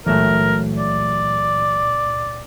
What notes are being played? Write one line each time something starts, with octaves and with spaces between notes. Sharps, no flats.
C#2 A#2 E3 F#3 A3 A#4
D5